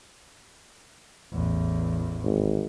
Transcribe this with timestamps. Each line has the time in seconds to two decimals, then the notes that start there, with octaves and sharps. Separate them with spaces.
1.33 A1 E2
2.24 G#1